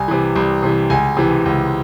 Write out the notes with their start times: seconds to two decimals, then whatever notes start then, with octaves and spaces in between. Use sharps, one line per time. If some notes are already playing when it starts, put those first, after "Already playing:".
Already playing: C2 G#5
0.08 C3 E3
0.36 C2
0.63 C3 E3
0.90 C#2 G#5
1.17 C3 E3
1.45 C#2